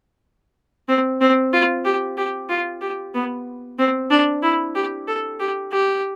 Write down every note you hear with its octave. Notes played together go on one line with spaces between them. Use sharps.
C4
C4
F4
G4
G4
F4
G4
B3
C4
D4
E4
G4
A4
G4
G4